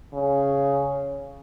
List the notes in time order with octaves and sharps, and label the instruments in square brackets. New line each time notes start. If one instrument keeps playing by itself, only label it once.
[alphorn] C#3